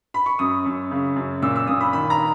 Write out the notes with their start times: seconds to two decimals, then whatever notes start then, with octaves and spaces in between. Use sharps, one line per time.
0.14 B5
0.26 C#6
0.39 F#2 D#6
0.66 F#2
0.91 C#3
1.16 F#2
1.42 A#2 E6
1.56 E6
1.67 A#2 D#6
1.81 B5
1.93 D#3 B5
2.10 A#5